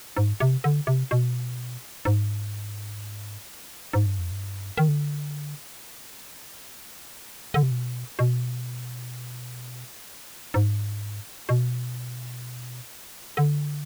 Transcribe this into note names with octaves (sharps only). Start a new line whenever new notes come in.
G#2
C3
D3
C3
B2
G#2
G#2
G2
F2
G2
D#3
D3
D3
C3
B2
B2
G#2
B2
D3